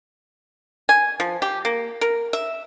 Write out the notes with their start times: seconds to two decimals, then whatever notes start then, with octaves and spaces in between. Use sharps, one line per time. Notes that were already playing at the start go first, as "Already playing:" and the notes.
0.89 G#5
1.20 F3
1.42 G4
1.65 A#3
2.01 A#4
2.33 E5